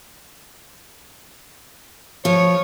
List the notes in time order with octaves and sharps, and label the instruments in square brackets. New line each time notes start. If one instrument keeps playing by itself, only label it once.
[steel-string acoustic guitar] F3 [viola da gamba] C#5